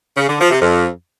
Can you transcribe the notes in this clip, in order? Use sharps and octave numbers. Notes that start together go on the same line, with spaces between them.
C#3
D3
F3
C3
F2